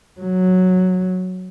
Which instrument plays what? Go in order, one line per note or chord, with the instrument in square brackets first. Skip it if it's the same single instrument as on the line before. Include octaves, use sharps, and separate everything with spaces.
[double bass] F#3